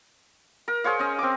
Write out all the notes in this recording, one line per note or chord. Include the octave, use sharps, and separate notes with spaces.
A#4
G#4 C5 C#5 F5
C#4 D#5
C4 D6